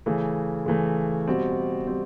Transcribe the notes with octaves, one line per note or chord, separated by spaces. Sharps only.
C#3 E3 A3
C#3 E3 A3
B2 G3 C4
G3 C4